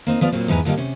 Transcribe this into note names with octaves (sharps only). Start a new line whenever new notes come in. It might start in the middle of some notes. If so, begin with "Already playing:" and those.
A#3 C4 D#4
F3 B3 D5 F5
G2 A#2 F#3 A#3 C4
E2 G#2 B4 G#5 A#5
G2 D3 G3 A#3 D#5 G5
C3 C#4